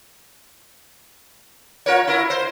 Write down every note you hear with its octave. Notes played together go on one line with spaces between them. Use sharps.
F4 A#4 C#5
E4 A#4
C5